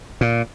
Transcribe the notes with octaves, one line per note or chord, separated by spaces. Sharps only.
A#2